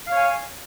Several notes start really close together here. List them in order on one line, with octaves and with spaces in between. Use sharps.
F5 C#5 G#5